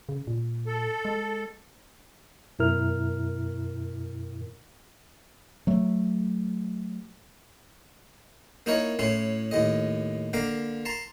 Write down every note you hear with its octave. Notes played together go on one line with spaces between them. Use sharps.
C#3
A#2
A4
G#3
F#2 B2 E4 A#4 F6
F#3 A3
A#3 D#4 E4 A#4 C#5
A2 C#4 E4 C6
D#2 A2 D#5
D3 A#3 F5 A#5 D6
A5 A#5 C6